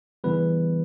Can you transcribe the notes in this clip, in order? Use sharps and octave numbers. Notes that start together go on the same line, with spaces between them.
C#3 E3 G3 B3 B4